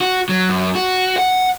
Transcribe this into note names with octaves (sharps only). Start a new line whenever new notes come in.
F#4
F#3
F#2
F#4
F#5